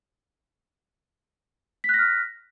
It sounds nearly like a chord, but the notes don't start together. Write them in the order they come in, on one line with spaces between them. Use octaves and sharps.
B6 F#6 A#6 F6